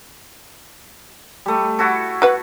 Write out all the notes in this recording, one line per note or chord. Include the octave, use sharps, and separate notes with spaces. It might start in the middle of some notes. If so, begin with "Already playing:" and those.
G3 A3
E4 F#4 A4
F#4 B4 F#5